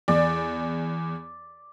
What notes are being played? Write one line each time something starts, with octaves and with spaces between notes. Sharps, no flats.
E2 D5